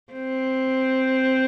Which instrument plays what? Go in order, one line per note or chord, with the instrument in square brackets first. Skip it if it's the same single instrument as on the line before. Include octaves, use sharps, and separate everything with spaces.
[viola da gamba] C4